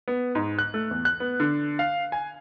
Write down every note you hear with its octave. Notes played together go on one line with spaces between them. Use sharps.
B3
G#2
F#6
A3
E2
F#6
B3
D3
F5
G#5